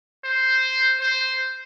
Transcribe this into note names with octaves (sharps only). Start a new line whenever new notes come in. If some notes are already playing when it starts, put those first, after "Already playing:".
C5
C5